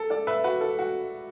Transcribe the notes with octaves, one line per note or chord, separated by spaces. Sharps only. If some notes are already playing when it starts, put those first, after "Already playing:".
Already playing: A4
A4 D5
B4 E5
F#4 B4
A4
F#4